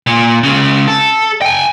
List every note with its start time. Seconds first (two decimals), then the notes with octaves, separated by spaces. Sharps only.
0.07 A#2
0.43 C#2 C#3
0.87 A4
1.42 G5 G#5